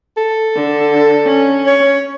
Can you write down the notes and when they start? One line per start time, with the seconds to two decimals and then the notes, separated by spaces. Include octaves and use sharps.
0.17 A4
0.56 D3
1.26 C#4
1.67 C#5